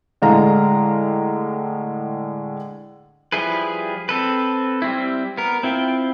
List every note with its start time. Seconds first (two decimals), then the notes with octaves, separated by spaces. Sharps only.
0.22 A2 D3 G#3 F5 A#5
3.32 F3 G3 E4 G#4 B4
4.09 C4 A4 B4
4.82 G3 C4 E4
5.38 B3 A#4
5.63 C4 E4 F4 G5